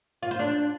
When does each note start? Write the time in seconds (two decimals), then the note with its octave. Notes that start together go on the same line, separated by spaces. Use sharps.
0.23 F4
0.31 C5
0.39 D4